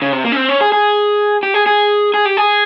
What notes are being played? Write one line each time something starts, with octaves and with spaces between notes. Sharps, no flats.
C#3
C3
A#3
C#4
C4
C#4
G#4
G#4
G4
G#4
G#4
G#4
G4
G#4